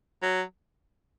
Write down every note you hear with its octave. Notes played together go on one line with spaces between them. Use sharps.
F#3